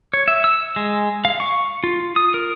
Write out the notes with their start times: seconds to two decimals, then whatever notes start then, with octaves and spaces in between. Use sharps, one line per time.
0.14 C#5
0.28 E5
0.44 E6
0.76 G#3
1.25 F5
1.40 C#6
1.84 F4
2.16 D#6
2.34 A#4